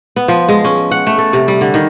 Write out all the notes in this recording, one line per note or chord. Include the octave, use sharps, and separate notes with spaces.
B3
F3
G#3
C#4
F#5
A3
A4
C3
G3
D3
D#3